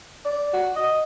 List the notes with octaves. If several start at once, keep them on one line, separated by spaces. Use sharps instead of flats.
D5
F#4
D#5